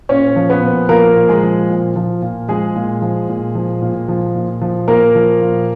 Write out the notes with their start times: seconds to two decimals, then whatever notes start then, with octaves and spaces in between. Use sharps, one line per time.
0.09 A#2 C#4 C#5
0.36 F3
0.49 B3 B4
0.63 A#2
0.89 F3 A#3 A#4
1.16 A#2
1.29 G#3 G#4
1.43 F3
1.69 A#2
1.96 F3
2.22 A#2
2.48 F3 G#3 G#4
2.75 A#2
3.02 F3
3.29 A#2
3.55 F3
3.82 A#2
4.08 F3
4.35 A#2
4.61 F3
4.88 A#2 A#3 A#4
5.15 F3
5.41 A#2